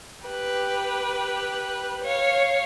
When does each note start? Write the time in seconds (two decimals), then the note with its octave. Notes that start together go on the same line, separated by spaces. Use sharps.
0.25 G4 B4
2.04 C#5 F5